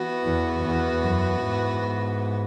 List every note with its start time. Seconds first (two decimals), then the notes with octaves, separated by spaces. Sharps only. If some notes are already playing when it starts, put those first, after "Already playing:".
Already playing: E3 B3 F#4
0.24 E2
0.62 E2
1.02 F#2
1.41 G#2